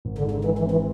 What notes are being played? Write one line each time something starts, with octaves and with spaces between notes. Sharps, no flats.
G#1
D3
G#2
D3
E3 G#3
E3
C4
E3